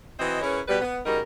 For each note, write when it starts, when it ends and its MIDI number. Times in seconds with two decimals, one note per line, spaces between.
0.19 0.41 52
0.19 0.41 60
0.19 0.41 66
0.19 0.41 75
0.42 0.60 61
0.42 0.60 64
0.42 0.60 68
0.42 0.60 70
0.42 0.60 71
0.42 0.60 73
0.68 0.80 47
0.68 0.80 55
0.68 0.80 71
0.81 0.99 59
1.06 1.20 49
1.06 1.20 55
1.06 1.20 63
1.06 1.20 66
1.06 1.20 70